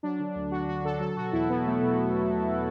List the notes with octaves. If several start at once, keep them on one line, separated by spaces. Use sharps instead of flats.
F#3 D4
D3
D2
D2 F#4
F#3 F#4
D3 A4
F#3 A4
B2 F#4
E2 E4
E2 B3
F#3 A3
B2 B3